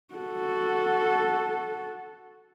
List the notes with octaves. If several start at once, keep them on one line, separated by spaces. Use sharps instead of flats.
F#4 A4